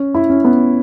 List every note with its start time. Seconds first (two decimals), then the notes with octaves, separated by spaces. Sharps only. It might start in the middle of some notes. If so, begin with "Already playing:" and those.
Already playing: C#4
0.15 E4
0.30 C#4
0.44 B3